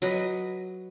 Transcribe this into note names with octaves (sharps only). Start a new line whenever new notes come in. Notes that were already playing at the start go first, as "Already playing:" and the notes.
F#3 B4 D#5